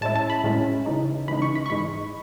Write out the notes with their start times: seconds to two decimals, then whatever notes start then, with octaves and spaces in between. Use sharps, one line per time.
0.01 A2 G#3 C#4 E4 A5
0.16 A5
0.30 B5
0.44 A2 G#3 C#4 E4
0.86 C#3 E3 G#3 D#4
1.28 C#3 E3 G#3 D#4 B5
1.42 C#6
1.55 B5
1.66 C#6
1.70 G#2 E3 G#3 D#4 B5